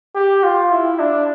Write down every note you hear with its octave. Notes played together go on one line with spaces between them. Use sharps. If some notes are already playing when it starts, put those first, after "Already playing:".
G4
F4
E4
D4